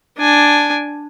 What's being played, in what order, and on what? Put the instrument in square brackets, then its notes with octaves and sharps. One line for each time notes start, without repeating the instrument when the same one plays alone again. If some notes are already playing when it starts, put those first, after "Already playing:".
[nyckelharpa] D4 G#5